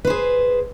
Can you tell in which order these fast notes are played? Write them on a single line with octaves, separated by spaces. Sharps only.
B4 C5 G#4